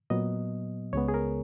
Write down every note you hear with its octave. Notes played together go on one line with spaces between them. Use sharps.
A#2 F#3 B3 D#5
C#2 C#3 G#3 B3 C#5
G#4
A#4